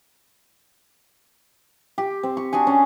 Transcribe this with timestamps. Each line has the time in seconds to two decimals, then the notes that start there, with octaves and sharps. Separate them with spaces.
1.98 G4
2.23 C4
2.37 C#6
2.53 D4 F#4 G#4 G#5
2.67 C#4